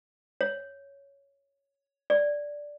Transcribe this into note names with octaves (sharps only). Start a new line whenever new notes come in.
C#5
D5